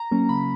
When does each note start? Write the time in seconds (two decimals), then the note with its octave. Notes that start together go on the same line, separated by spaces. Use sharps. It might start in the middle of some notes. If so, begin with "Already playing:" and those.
Already playing: A#5
0.11 F#3 A#3 C#4
0.29 C#3 B5